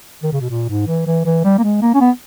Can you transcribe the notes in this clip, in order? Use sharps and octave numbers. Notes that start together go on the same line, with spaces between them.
D#3
C#3
B2
A#2
G#2
E3
E3
E3
G3
A#3
G#3
A#3
C#4
B3